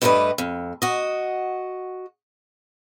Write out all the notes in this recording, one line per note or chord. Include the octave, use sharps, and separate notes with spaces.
G2 G3 A3 C#4 B4 D#5
F2
F#4 D#5